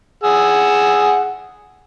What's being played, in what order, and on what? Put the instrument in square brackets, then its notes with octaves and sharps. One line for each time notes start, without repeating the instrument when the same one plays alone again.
[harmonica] G#4 F#5 E6